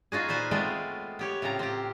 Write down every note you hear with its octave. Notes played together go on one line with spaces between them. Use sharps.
B3 D#4 F4 F#4 G#4
A#2 F4 B4 C5 G#5
G#3 A3 B3 C4 F4 D5
B3 G4 C#5
A2 C#3 C4 F4 A#5
C4 F4 G4